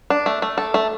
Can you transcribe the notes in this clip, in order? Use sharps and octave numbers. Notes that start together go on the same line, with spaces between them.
D4
A3
A3
A4
A3